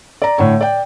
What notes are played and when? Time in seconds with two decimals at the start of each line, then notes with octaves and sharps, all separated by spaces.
0.22 D5 A#5
0.38 A2 D3 C#5
0.61 D5 G5